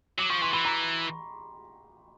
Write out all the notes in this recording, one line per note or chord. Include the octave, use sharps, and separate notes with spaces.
F#3 D6
F3 C#6
E3 C6
E3 B5
A#5